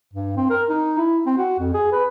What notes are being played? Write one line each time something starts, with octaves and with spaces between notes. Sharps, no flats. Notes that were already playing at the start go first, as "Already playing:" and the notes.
G2
C4
A#4
D#4
E4
C4
F#4
F2
G#4
B4